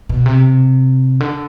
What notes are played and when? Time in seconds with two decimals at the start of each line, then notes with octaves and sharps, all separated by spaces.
0.09 B2
0.26 C3
1.20 D3